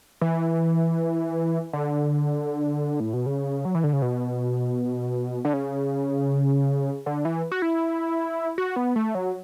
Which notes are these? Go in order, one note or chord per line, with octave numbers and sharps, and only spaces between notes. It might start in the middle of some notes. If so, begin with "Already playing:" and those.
E3
D3
A2
B2
C#3
F#3
E3
D3
C#3
B2
D3
C#3
D3
E3
F#4
E4
F#4
B3
A3
F#3